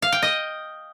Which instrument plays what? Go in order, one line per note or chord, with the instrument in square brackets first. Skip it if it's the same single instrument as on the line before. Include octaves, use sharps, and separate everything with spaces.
[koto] F5
G5
D#5